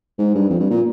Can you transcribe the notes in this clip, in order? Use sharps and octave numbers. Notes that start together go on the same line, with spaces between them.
G#2
G2
F2
G2
A#2